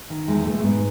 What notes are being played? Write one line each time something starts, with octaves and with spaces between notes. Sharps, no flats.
D#3
E2 G#3
B2 A3
A3
G#2 B3